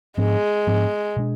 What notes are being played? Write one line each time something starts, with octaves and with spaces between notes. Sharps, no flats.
G#2 F3 G#3 B3 D4
G#2 F3 B3 D4
B2 G#3 D4